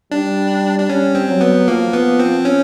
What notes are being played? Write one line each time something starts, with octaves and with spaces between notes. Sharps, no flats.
G3 D4
D4
G3 C#4
C4
F#3
B3
F3 A#3
B3
C4
C#4